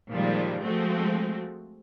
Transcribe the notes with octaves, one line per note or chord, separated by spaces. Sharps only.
A#2 D#3 F3 G3 G#3
F3 G#3 A3 C4 F#4